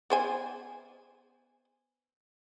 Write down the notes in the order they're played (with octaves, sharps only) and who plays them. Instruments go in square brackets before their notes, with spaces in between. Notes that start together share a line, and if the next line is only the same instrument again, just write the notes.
[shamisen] B3 C5 G#5